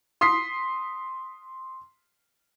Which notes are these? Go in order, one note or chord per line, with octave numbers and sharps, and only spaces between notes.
C6 D#6 B6 C7